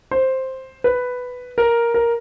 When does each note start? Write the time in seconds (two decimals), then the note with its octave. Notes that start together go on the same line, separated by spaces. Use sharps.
0.11 C5
0.84 B4
1.58 A#4
1.94 A#4